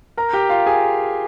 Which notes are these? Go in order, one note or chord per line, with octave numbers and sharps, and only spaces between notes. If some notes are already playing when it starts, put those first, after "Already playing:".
A#4 A#5
G4 G5
F4 F5
G#4 G#5